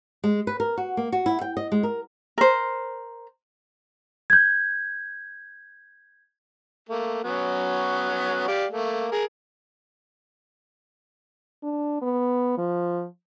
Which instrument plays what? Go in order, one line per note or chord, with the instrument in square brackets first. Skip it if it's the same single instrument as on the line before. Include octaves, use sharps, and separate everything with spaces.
[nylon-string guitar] G#3
B4
A#4
F#4
A#3
F#4
E4
G5
D#5
G#3
A#4
[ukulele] A#4 C5
[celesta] G6 G#6
[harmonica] A3 A#3
F#3 B3 C#4
G4 D5 F5
A3 A#3
G#4 A#4
[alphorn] D4
B3
F3